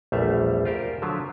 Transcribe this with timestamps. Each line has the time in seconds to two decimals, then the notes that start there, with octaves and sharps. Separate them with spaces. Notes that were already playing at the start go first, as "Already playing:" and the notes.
0.12 A#1 E2 G3 A3 E5 F5
0.65 F4 G4 A#4 C5 D5
1.02 D3 F3 F#3 F4 E5